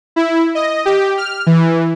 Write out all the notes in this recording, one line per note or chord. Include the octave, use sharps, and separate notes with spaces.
E4
D#5
G4
F6
E3